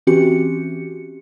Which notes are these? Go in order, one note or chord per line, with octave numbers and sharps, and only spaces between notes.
E3 C4 C#4 F#4 G4 C#7